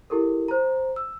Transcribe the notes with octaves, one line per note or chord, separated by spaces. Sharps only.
E4 G4 A4 A#4
C5 A#5
E6